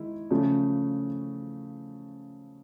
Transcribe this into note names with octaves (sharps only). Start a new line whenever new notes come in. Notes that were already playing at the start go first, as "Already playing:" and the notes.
Already playing: D#3 G#3 E4
C#3 F3 A3 C#4